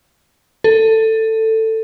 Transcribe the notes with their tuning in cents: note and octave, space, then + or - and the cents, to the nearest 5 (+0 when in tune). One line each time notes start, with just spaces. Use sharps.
A4 +15